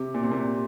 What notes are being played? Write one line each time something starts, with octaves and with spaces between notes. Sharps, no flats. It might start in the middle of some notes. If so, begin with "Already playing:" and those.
Already playing: C3
A#2
C3
A#2